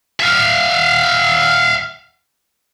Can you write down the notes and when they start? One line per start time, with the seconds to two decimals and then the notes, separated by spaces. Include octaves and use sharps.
0.20 E5 F5